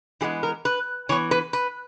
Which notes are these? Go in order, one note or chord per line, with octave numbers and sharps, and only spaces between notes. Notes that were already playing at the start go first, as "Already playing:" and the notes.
E3 G#3 B3 G#4
A#4
B4
E3 B3 C#5
B4
B4